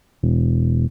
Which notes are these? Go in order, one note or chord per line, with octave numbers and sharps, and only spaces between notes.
E1